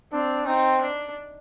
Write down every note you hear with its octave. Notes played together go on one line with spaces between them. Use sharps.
C4 D4
C4 D#4
D4